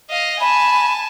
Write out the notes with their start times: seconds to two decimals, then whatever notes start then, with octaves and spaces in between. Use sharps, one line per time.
0.10 D#5 F5
0.41 G#5 A5 B5